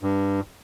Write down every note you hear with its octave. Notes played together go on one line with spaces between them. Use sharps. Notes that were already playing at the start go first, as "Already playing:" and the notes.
G2